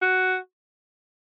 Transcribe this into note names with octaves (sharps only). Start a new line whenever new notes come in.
F#4